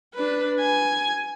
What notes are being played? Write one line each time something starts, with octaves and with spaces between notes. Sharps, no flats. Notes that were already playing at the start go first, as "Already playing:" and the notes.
D4 B4
G#5